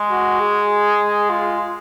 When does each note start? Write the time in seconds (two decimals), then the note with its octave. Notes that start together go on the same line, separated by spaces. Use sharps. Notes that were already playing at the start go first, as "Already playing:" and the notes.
Already playing: G#3
0.10 F#4
0.40 G#4
1.30 F4